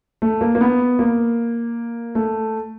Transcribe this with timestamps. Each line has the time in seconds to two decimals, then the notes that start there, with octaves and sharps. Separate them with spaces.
0.22 A3
0.41 A#3
0.55 A#3
0.61 B3
0.99 A#3
2.15 A3